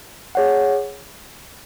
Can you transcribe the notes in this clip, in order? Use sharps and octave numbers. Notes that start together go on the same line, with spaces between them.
G#4 C#5 F#5